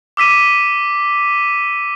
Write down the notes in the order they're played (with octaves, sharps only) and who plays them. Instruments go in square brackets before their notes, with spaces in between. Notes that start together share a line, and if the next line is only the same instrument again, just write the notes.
[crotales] D6 E6 B6 D#7